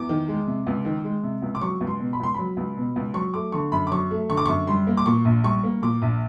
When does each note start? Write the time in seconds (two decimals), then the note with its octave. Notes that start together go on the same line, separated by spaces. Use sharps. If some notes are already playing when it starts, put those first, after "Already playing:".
Already playing: E2 D6
0.09 D#3
0.28 G#3
0.47 C3
0.67 C#2
0.85 D#3
1.04 G#3
1.23 C3
1.42 C#2
1.55 D6
1.61 F#3 C#6
1.81 C#2
1.87 C6
2.00 B2
2.13 B5
2.20 C#2 C6
2.34 F#3 B5
2.57 C#2
2.77 B2
2.96 C#2
3.14 F#3 C#6
3.34 A3 D6
3.52 D3 C#6
3.72 F#2 B5
3.87 D6
3.91 F#3 C#6
4.11 A3
4.29 D3 C#6
4.37 D6
4.45 F#2 C#6
4.67 G3 C6
4.87 A#3
4.97 D6
5.06 A#2 C#6
5.25 A#1
5.44 G3 C#6
5.63 A#3
5.82 A#2 D6
6.02 A#1